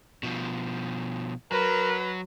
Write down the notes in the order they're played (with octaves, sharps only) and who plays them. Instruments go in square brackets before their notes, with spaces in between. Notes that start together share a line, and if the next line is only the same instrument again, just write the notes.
[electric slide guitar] B2 F3
[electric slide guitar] F#3 [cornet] A#4 [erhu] B4